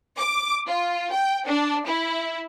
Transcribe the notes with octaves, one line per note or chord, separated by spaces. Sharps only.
D6
F4
G5
D4
E4